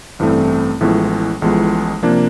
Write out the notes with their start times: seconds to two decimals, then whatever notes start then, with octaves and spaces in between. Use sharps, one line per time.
0.19 A1 G2 E3 A3 C4
0.81 A1 A2 F3 G#3 B3
1.42 A1 A2 F3 G#3 B3
2.03 C3 F3 A#3 D4